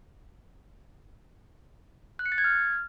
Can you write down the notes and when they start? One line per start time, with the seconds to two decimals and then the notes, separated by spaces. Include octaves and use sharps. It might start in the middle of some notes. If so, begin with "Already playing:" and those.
2.19 F#6
2.26 C#7
2.32 A6
2.38 G#6
2.44 F6